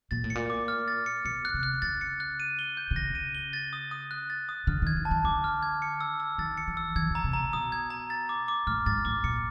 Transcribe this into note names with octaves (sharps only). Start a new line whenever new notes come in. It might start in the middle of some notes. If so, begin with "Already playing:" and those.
A#2 A6
A2
C#7
A#2
D6
F6
A6
C#7
B2 C#7
F#6
C3
F#6
C#3 A6
C#7
F#6
D#7
G7
G6
C3
C#3 A#6
D#7
G7
A6
D#6
D#6
F#6
A6
D#6
D3 F6
D#3 G#6
E3
A5
D#3
D3 D6
F6
G#6
C#7
E6
E6
D#3 A6
C#7
E3
E6
E3 G#6
D3 A#5
C3
B2 A#5
B2 D#6
G#6
A#5
A6
D6
D6
A2 F6
G#2 A6
A2 D6
A#2 C#7